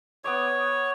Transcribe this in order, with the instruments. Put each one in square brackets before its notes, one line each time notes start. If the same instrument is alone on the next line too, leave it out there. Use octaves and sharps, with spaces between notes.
[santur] B3 D6 D#6 [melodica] C#5